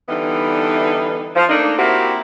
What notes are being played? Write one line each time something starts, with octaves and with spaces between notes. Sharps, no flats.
D3 E3 G3 B3 D#4
F3
A3 A#3 D4 D#4
A#3 C4 E4 F#4 G4